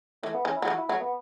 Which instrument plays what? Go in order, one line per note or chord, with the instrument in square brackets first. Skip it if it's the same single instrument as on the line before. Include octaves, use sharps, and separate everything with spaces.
[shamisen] E3 [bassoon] A3
[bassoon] B3
[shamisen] E3 [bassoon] C#4
[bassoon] E4
[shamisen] F#3
[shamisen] E3 [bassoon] F#4
[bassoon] E4
[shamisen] F#3 [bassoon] A3
[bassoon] B3